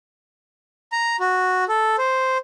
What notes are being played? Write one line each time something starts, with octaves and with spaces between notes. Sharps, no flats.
A#5
F#4
A4
C5